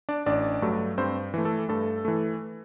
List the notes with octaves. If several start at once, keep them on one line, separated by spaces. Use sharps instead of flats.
D4 D5
A1 D4 D5
G2 F#3 A3
G2 C4 C5
E3 A3
A3 A4
G2 A3 A4
E3 A3